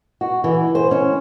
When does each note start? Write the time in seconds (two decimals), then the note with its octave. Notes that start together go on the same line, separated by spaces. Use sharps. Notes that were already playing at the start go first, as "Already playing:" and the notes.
0.21 F#4
0.44 E3
0.75 C5
0.91 C#4